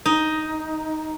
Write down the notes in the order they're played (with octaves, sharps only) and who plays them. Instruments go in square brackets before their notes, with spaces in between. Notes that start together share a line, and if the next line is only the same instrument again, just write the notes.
[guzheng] D#4